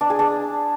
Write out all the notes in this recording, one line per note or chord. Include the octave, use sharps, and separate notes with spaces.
D4
G#4
D4